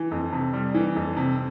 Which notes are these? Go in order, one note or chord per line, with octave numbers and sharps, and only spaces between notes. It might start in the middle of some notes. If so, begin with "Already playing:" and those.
Already playing: E3
F2
C3
G3
E3
F2
C3